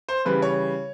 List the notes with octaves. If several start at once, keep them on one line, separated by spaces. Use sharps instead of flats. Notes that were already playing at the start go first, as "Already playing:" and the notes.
C5
C#3 E3 G3 B4
C#5